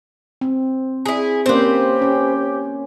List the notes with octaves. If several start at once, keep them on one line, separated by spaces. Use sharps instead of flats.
C4
E4 G#4
A#3 C4 C#4 G4 B4 C5
C#4